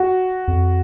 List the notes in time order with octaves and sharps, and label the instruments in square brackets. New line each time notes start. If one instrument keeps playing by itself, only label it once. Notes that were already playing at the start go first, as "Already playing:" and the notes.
Already playing: [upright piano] F#4
[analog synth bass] F2